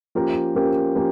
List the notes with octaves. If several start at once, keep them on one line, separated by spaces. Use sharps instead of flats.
F3 A#3 C#4 G4 A#4
F3 A#3 C#4 G4 A#4
F3 A#3 C#4 G4